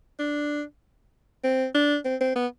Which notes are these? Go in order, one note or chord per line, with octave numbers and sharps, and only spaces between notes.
D4
C4
D4
C4
C4
B3